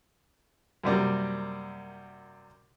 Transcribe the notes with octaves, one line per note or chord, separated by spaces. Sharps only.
F#2 C3 G3 A#3